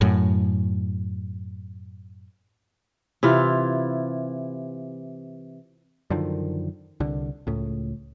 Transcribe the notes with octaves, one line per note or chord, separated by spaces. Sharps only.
F#2 A2
C3 E3 E4 F4
F#2 D3 D#3 F3
C2 D3
C#2 A2